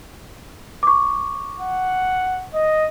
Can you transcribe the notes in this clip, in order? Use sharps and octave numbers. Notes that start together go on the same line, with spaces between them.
C#6 D6
F#5
D#5